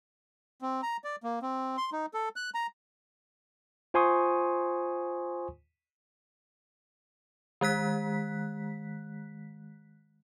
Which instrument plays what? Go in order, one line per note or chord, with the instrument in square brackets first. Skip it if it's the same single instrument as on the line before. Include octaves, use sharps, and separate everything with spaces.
[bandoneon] C4
A#5
D5
A#3
C4
C6
D#4
A4
F#6
A#5
[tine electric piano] F4 C5 G#5 C6 C#6 D#6
[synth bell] D#3 G#3 F#6 B6